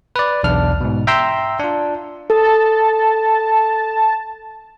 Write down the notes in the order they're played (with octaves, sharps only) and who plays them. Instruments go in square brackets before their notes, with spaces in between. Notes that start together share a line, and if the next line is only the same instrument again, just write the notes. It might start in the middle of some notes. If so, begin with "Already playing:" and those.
[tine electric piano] B4 D5
B1 E2 D4 F6
G#2 B2
E5 G5 A#5 C6 E6
D4 F4
[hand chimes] A4 [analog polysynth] A5